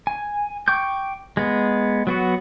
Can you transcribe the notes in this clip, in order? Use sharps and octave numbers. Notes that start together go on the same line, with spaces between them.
G#5
G5 C#6 D6 G6
G#3 B3
F#3 B3 F#4